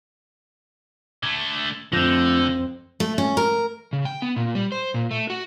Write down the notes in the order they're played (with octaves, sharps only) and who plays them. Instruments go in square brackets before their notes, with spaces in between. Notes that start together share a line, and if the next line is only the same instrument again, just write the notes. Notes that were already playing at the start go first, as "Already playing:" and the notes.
[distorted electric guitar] D3 A3 [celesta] G#6
[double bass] F2 C4 [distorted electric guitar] D3 [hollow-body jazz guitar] F3 A3 [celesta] E6 G6 A#6
[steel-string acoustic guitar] A3
C#4
A#4
[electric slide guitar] C#3
G5
B3
A#2
G3
C5
A#2
A3
F#4